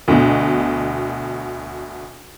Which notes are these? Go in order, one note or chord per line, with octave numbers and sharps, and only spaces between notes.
D2 B2